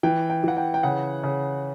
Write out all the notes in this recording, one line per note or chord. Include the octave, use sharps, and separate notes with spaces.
E3 G5
G5
E3 F#5
G5
G5
C#3 F#5
C#3